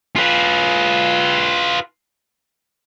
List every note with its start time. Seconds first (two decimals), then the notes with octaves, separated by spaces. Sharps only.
0.16 F4 B4